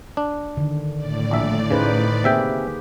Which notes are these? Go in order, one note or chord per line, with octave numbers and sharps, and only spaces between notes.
D4
D3 D#3
A2 D5
A#1 E5
C#3 D#4 B4 C5
C3 A#3 G4 G#4 E5 G5